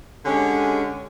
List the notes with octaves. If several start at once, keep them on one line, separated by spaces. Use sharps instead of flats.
D3 G#3 C#4 G4